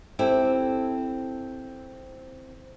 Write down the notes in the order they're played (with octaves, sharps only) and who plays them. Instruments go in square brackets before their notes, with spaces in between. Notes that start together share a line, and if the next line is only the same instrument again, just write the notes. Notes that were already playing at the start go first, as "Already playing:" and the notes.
[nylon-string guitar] C4 E4 G4 A4